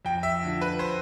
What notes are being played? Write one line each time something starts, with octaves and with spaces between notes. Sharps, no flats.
F2 G5
E5
D3 F3
B4
C5